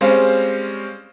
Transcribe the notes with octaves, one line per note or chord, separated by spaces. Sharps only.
G3 G#3 C4 C#4 C5 F5